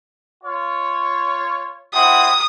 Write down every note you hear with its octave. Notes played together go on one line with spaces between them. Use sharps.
F4 C#5
C4 E4 F#5 D#6